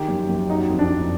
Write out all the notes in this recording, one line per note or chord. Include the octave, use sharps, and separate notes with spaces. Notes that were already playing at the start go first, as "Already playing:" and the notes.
Already playing: D#3 G4
F#2
F#2
F#3 D#4
F2
D4
F2